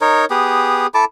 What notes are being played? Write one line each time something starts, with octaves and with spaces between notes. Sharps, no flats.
D#4 A#4 C#5
B3 G4 G#4
E4 A4 A5 D6